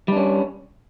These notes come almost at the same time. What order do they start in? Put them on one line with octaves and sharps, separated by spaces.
G3 D4 C#4